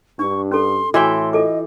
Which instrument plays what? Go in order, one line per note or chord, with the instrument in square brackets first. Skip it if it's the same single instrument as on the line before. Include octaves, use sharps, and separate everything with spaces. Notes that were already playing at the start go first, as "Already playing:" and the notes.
[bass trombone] G2 [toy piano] D4 [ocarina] C#6
[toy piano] C#4 A4 [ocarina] C6
[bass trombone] A2 [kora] E3 E5 G5 [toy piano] F#4 D6 [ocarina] C6
[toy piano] F4 A4 D6 [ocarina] D#5